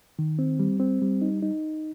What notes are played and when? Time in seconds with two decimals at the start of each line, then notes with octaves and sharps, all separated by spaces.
0.19 D#3
0.39 C4
0.60 G3
0.80 C4
1.02 G3
1.22 D#4
1.43 D#4